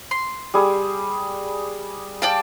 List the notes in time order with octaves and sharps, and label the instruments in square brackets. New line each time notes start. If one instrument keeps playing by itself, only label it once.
[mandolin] C6
[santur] G3 G#4
[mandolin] D5 G5 A5 [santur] F5